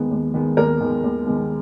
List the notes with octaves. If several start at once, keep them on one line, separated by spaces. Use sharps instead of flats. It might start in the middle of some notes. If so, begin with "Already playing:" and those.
Already playing: D#2 D#3 G#3 B3
D#2
D#3 G#3 B3
D#2 A#4
D#3 G#3 B3
D#2
D#3 G#3 B3